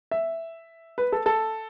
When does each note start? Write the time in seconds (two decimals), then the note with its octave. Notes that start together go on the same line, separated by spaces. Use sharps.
0.11 E5
0.98 B4
1.12 A4
1.26 A4